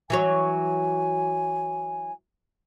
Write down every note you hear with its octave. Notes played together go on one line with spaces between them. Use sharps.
E3 F#3 C#5 G#5